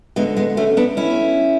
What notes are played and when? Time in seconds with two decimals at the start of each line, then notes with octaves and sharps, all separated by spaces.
0.16 D2 D3 G#3 B3
0.37 G#3 B3
0.57 A3 C#4
0.77 B3 D4
0.97 C#4 E4